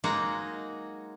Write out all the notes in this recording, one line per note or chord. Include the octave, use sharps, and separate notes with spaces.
F#3 G#3 A#3 D#4 F#4 G#4